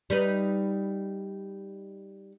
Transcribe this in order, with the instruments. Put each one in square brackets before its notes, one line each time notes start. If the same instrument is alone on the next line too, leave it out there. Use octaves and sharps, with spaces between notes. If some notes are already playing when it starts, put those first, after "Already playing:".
[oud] G3 D#4 B4